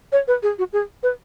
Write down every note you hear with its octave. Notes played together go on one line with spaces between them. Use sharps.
C#5
B4
G#4
F#4
G#4
B4